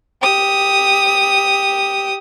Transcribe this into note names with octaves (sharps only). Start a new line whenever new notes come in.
G4 D#6